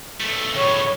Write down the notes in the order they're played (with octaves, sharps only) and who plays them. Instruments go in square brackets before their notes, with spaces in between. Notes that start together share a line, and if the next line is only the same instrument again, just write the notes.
[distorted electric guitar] B1 A3
[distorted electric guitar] C#2 A2 [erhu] C#5